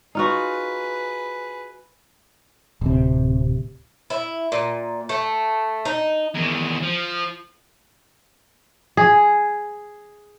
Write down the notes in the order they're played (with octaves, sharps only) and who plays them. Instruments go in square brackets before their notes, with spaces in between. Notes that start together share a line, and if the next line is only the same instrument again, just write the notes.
[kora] D#4 F4 F#4 [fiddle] G#4 B4
[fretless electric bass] D1 C3
[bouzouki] E4
A#2
A3
D#4
[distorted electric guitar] E2 D#3
F3
[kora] G#4